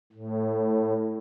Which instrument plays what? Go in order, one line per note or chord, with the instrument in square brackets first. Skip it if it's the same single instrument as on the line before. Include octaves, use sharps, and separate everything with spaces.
[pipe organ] A2